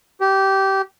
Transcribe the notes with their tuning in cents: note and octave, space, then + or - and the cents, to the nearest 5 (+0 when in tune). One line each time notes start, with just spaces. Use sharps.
G4 -20